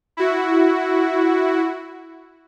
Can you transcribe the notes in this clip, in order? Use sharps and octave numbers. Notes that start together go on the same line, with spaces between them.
E4 F#4